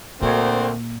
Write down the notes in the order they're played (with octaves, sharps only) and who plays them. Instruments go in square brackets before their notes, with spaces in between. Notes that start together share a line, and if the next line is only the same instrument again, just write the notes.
[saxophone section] D2 [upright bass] A#2 [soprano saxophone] C4 [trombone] A#4